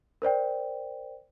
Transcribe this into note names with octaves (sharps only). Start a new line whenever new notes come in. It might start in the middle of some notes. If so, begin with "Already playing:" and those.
A#4 C5 D5 G5